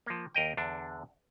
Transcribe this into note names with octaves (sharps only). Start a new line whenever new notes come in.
F3 A#3
D#2 A#4 D#5 G5
E2 D3 D4